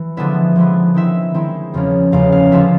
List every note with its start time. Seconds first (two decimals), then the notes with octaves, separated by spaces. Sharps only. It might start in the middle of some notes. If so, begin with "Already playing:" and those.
Already playing: E3
0.17 D3 F3 G#3 B3 E4 E5
0.56 D3 F3 G#3 B3 E4
0.94 D#3 G#3 C4 E4 E5
1.34 D#3 G#3 C4 E4
1.74 E2 C#3 F3 A#3 C#4
2.12 E2 C#3 F3 A#3 C#4 F5
2.32 F5
2.51 D3 F3 G#3 C#4 F4 E5